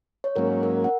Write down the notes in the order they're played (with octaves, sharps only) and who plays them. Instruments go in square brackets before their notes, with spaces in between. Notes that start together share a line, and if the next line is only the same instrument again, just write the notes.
[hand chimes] C#5
[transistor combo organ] G#2 F#3 A#3 C#4 [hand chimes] A#4
[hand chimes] A#4
F#5